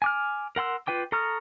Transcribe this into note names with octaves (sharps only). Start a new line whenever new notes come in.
G#5 D6 F6
A#4 F#5 C6 E6
F4 B4 G5 D6
A4 A#5 C#6 D#6 F6